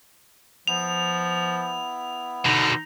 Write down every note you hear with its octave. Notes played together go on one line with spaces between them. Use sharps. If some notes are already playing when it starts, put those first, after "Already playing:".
F3 B3 E4 F7
B2 D3 D#4